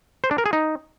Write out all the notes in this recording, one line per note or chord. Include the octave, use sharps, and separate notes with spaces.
C5
D4
A#4
G#4
D#4